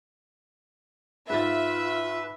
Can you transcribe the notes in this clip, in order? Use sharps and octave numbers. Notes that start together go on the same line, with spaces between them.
G#2 F4 B4 E5 A6